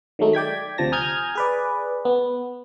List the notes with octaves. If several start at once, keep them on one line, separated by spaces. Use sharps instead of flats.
D#3 F#3 G#3 A3 D#4
D5 G5 G#6 B6
D2 C3 F3 A5 A#6
G#5 A#5 D#6 F6 G6 G#6
G#4 B4 D5
B3